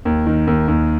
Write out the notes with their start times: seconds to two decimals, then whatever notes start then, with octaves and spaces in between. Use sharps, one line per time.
0.05 D#2
0.27 D#3
0.47 D#2
0.68 D#2